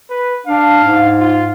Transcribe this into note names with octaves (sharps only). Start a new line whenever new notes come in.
B4
D4 F5
G#2
F4